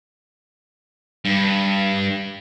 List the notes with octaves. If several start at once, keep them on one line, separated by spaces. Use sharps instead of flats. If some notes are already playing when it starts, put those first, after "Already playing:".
G2